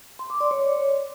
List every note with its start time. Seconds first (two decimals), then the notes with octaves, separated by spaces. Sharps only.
0.19 C6
0.30 D6
0.40 D5
0.51 C#5